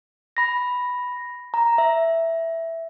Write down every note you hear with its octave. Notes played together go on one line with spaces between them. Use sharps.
B5 A#6
A#5
E5